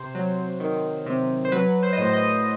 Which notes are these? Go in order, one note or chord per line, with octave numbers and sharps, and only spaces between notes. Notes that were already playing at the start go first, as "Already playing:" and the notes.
Already playing: C3 C5
F#3
D#3
C3
C5
F#3 B4
C5
D#5
A2 C5
D#5